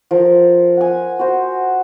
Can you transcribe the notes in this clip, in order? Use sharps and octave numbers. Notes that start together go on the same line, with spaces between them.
F3 A#4
F#5 G#5
F#4 C5